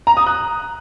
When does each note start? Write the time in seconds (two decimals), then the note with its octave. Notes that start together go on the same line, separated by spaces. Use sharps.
0.07 A#5
0.17 D#6
0.27 F#6